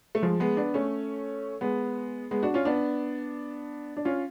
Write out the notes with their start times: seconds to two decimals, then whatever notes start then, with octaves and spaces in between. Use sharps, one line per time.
0.15 A3
0.23 F3 G#3
0.40 G#3 B3
0.57 B3 D4
0.74 A3 C#4
1.61 G#3 B3
2.31 G#3 B3
2.43 D4 F#4
2.54 C#4 F4
2.65 B3 D4
3.97 D4
4.05 C#4 F4